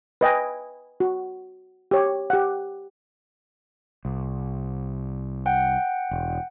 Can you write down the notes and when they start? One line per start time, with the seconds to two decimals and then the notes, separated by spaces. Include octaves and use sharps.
0.21 B4 D#5 G5 G#5
1.00 F#4
1.91 G4 C#5
2.30 G4 F#5
4.05 C2
5.46 F#5 G5
6.11 E1